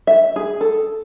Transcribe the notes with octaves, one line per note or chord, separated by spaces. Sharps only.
E5
G#4
A4